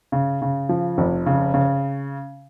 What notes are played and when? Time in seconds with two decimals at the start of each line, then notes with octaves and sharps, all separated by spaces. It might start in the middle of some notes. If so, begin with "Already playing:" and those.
0.12 C#3
0.42 C#3
0.69 F3
0.98 F1
1.26 C#3
1.54 C#3